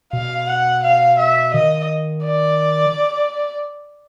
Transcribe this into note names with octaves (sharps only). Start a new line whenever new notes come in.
B2 F5
F#5
F5
E5
D#3 D#5
D5